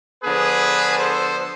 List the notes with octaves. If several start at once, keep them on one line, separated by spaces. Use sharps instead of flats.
D3 F3 B3 G#4 B4
A4 C5